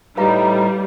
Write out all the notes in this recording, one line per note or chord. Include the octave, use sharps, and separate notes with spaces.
A2 G3 D#4 B4 F5 A#5